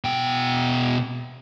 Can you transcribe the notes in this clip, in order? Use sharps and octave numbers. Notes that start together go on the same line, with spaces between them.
B2 G5